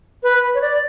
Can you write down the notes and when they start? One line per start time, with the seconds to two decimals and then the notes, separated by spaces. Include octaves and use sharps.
0.23 B4
0.55 C#5
0.61 D5